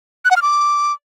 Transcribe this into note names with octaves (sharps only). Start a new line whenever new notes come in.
F#6
F#5
F6
D6